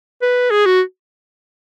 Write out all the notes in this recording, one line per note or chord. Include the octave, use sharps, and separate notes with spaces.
B4
G#4
F#4